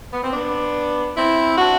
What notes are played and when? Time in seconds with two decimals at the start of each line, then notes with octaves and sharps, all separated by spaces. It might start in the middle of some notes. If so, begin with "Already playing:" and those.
0.12 B3
0.22 C4
0.32 B3 D4
1.15 C4 E4
1.57 D4 F#4